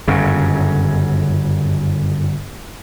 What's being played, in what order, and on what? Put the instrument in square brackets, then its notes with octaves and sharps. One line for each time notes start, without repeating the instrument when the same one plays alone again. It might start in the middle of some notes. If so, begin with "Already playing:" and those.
[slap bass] G1 F#2 C#3